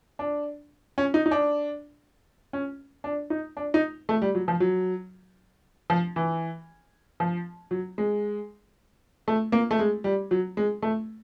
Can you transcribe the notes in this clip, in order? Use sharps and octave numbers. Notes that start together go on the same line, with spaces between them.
D4
C#4
D#4
D#4
D4
C#4
D4
D#4
D4
D#4
A3
G3
F#3
F3
F#3
F3
E3
F3
F#3
G#3
A3
A#3
A3
G#3
G3
F#3
G#3
A3